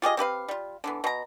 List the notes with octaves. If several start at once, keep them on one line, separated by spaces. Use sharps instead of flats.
F4 G4 G#4 D#5
C4 G4 B4 F5
G3 F4
D3 E3 B3
B2 A#5